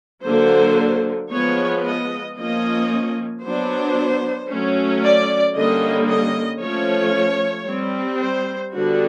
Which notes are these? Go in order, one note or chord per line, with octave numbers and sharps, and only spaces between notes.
D3 F#3 A#3 C5
F3 G#3 B3 C#5
D#5
F3 A#3 C#4 D#5
F#3 B3 D4 C5
F#3 A3 C#4
D5
D3 G3 A#3 C#4 D#5
D#5
F3 A3 C#4 C#5
G3 C4
C5
D3 G3 B3 D4 F#4